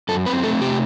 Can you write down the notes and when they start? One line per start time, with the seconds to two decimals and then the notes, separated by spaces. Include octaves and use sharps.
0.09 F#2 A4
0.26 C4 B4
0.43 A3 A4
0.61 C3 G4